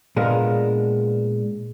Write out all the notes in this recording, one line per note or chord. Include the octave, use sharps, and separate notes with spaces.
A#2 G#3 B3 D4 A#4